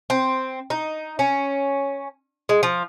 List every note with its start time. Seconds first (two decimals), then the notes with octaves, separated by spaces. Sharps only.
0.10 C4
0.70 D#4
1.19 C#4
2.49 G#3
2.63 F3